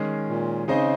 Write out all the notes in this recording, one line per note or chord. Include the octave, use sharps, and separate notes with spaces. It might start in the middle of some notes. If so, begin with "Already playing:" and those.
Already playing: D#3 G#3 C#4 G#4
A#2
C#3 C4 D#4 G#4 C5 D#5